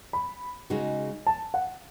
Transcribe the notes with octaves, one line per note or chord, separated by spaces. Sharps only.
B5
C#3 G#3 D#4 F#4
A5
F#5